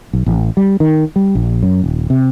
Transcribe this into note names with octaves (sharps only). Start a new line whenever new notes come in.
B1
A1
G3
D#3
G3
A#1
F#2
D#1
C3